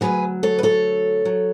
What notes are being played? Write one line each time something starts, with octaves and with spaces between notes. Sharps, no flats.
D2 C#3 F#3 G#4 B4
A4 C#5
B4
A4 C#5
F#3